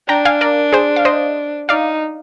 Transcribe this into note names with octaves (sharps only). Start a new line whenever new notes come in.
D4 G5 A#5
F5 G#5
A#4 D5
G#4 C5
F5
C5 D#5
D#4 D5 F5